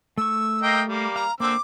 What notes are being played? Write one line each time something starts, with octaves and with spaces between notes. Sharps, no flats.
A3 C#6 E6
A#3 D#5 G5
G3 A#3
F5 A#5
D3 A#3 C4 D6 E6